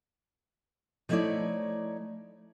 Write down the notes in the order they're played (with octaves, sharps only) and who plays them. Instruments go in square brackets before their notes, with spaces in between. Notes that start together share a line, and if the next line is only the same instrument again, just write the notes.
[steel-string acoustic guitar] F3 A3 D#4 E4 C#5 D5